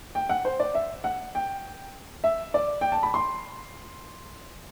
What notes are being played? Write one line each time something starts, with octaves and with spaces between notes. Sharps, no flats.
G5
F#5
C5
D5
E5
F#5
G5
E5
D5
G5
A5
B5
C6